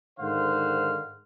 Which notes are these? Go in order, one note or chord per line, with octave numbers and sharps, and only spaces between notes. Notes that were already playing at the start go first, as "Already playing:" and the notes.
G#2 D3 D#3 C5 F5 F#5